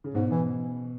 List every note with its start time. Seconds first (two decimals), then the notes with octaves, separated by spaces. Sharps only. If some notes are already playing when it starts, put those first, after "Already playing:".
0.04 C#3
0.14 G#2 B2
0.31 B2 E3